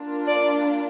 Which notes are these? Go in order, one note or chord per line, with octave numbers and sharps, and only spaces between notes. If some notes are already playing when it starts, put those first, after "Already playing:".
Already playing: A#3 D4 F4
D5